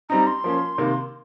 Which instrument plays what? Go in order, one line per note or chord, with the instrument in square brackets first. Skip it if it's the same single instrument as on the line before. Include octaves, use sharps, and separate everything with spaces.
[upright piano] G3 C4 D#4 [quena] A#5
[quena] C6
[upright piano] F3 A#3 C#4
C3 D#3 A#3